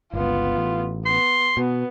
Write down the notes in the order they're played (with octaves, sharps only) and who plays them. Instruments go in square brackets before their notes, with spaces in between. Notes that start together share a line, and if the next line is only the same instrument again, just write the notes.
[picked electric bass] G1 C#2 [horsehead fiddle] B3 F4
[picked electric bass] A1
[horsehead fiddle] B3 [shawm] C6
[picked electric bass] B2 [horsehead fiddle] B3